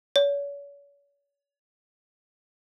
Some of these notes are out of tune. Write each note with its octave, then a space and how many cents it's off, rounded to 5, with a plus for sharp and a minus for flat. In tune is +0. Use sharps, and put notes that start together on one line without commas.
C#5 +40